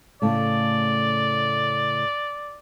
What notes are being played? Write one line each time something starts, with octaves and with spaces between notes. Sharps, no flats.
A2 C#3 A3 D5